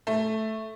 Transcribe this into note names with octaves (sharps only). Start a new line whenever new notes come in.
A3